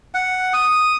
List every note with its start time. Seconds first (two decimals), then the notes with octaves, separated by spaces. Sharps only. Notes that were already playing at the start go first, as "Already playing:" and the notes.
0.14 F#5
0.53 D#6